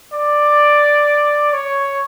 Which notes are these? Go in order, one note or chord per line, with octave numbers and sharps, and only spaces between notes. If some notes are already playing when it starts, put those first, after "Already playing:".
D5
C#5